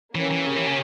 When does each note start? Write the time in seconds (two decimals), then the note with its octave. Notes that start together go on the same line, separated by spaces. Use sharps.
0.15 E3 A#3 C#4 G4 C#5
0.31 E3
0.46 C#3
0.56 E3
0.67 C#3